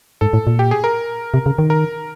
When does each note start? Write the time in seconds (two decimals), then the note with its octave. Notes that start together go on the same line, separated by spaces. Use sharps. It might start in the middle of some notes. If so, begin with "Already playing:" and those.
0.21 G#2 A4
0.33 A2
0.47 A#2
0.59 G4
0.71 G#4
0.84 A#4
1.34 C3
1.46 C#3
1.59 D#3
1.70 A#4